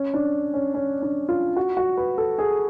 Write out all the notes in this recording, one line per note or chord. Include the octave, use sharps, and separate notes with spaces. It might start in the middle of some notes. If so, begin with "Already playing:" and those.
Already playing: C#4
D4
C#4
C#4
D4
F4
F#4
F#4
B4
A4
G#4